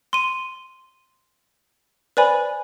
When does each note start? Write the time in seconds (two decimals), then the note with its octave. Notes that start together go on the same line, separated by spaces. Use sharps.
0.13 C6 D#7
2.17 B4 C5 D5 G#5 B5